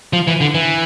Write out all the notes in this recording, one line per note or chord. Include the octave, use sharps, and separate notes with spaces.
F3
E3
D3
E3